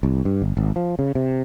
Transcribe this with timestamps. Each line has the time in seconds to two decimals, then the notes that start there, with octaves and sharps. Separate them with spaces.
0.03 C2
0.25 G2
0.42 G1
0.57 G#1
0.76 F3
0.99 C#3
1.15 C3